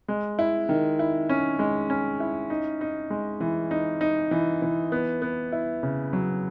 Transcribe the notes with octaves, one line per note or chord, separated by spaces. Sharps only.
G#3
E4
D#3
E4
C#4
G#3
C#4
E4
D#4
D#4
G#3
E3
D#4
D#4
E3
E3
B3
B3
E4
C#3
F#3